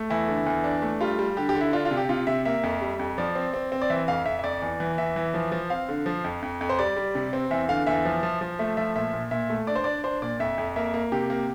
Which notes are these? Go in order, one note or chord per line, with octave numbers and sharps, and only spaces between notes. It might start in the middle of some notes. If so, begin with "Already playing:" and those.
Already playing: A3
E2 E4
D3
E2
D4
A3
G3 F4
G3
D3 G4
G4
D3
E4
D4 F4
F4
C3
G4
C3 F4
C3 E5
A#3 E5
F2
G3
F2
F3 D5
C4
C4
C4
D5
E3 E5
F2 F5
F2 E5
E5
F2 D5
E2
E3
E2 E5
E3
F3
F3
C4 F5
D3
F3
F2
F2
F2
C5
G3 D5
G3
C3
C4
E2 E5
D3 F5
E2 E5
F3
F3
F3
A3 E5
F3 E5
A#2 E5
A#2
A#2 E5
A3
D4 D5
C5
D4 D5
D4 C5
A#2 D5
F2 E5
F2
A#3 E5
A#3
C3 G4
A#3